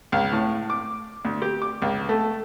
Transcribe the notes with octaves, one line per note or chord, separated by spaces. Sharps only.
C#2
A2
D6
D2
G4
D6
C#2
A3